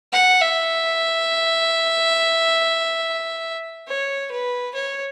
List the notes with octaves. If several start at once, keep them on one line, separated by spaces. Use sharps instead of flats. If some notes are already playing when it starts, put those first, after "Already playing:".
F#5
E5
C#5
B4
C#5